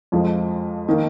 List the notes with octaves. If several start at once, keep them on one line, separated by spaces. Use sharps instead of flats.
F2 F3 G#3
D#3 A#3